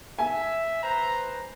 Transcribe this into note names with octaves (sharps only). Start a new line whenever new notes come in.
E5 G#5
B4 C5 A#5